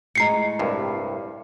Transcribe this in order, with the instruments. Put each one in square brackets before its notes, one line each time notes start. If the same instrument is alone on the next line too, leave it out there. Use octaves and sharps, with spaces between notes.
[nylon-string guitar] A2 G#3 [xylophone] A#5 C7 C#7
[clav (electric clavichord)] C2 G2